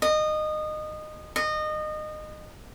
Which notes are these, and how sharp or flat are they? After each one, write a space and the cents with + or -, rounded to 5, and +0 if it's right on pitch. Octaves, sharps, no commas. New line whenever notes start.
D#5 -20
D#5 -25